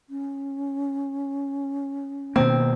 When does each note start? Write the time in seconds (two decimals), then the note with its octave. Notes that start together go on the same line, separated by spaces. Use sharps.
0.10 C#4
2.36 B2 D#3 A#3 C4